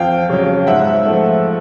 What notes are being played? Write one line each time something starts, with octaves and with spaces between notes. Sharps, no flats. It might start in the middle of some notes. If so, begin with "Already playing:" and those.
Already playing: F2 F5 G5
C#3 F#3
G#2 E5 F#5
F3 A3